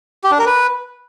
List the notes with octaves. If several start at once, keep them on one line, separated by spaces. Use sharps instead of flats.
G4
D4
A#4
B4